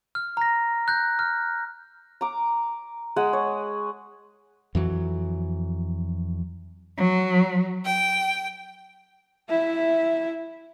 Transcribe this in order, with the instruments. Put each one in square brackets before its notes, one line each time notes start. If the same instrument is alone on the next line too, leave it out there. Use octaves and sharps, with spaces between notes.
[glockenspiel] F6
A#5 A#6
F#6 G6 A#6
F6
[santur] A#5 D6
G#3 G#4 F#5
C#5
[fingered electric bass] F2 E3 F#3
[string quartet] F#3
G5
[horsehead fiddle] E4 E5